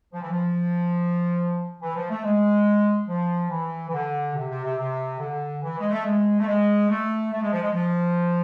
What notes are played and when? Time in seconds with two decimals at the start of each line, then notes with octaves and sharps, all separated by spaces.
0.13 F3
0.21 E3
0.30 F3
1.82 E3
1.95 F3
2.10 A3
2.23 G#3
3.08 F3
3.50 E3
3.89 E3
3.93 D3
4.35 C3
4.49 C3
4.63 C3
4.78 C3
5.19 D3
5.62 E3
5.79 G#3
5.90 A3
6.05 G#3
6.40 A3
6.47 G#3
6.88 A3
7.31 A3
7.41 G#3
7.52 F3
7.62 G#3
7.73 F3